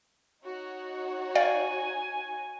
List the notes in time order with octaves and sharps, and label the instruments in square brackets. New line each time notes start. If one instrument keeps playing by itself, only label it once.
[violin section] D#4 F#4 C#5
[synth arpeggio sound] D5 F5 G5 [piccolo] G#5